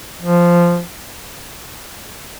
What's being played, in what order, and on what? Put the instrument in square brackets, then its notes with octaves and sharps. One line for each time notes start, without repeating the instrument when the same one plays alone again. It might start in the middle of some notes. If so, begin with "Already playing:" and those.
[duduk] F3